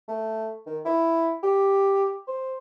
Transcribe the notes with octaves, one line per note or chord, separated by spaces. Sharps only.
A3
D#3
E4
G4
C5